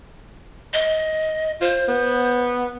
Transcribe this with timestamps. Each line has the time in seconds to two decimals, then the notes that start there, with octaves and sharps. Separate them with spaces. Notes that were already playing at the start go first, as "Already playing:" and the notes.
0.74 D#5
1.61 F4 C5
1.88 B3